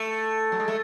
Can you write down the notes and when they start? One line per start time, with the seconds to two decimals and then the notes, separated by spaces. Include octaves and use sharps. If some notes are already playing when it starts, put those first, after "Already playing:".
Already playing: A3
0.52 F#3
0.60 G#3
0.68 A3